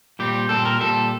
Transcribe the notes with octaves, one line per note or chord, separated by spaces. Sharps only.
A#2 G3 C4 G4
A#2 G3 C4 A4
A#4
A#2 G3 C4 A4